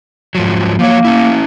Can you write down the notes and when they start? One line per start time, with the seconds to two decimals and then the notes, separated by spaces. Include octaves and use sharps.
0.35 G#2 F3 F#3
0.79 F3 F#3 A#3 C#5
1.04 C#4 E4